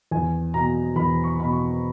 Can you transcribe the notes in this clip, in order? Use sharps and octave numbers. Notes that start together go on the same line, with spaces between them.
E2 G#5
B2 A#5
E2 B5
C#6
B2 B5
C#6